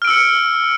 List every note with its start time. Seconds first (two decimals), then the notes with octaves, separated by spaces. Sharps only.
0.02 F6
0.05 D7
0.07 E6
0.10 C#7